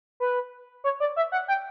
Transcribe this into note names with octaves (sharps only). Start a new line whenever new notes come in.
B4
C#5
D5
E5
F#5
G5